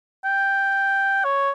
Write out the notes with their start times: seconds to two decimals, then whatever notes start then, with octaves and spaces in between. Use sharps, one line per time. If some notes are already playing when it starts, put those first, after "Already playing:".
0.25 G5
1.24 C#5